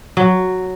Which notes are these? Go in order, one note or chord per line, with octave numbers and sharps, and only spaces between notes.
F#3